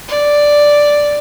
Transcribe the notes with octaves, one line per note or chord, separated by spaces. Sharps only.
D5